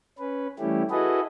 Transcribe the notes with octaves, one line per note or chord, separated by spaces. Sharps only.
C#4 B4
E3 G3 A3 C#4 E4 G4
E4 F#4 G#4 A4 B4 D#5